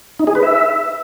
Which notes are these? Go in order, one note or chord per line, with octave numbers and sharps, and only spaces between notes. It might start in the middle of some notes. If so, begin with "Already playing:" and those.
D#4
G#4
B4
E5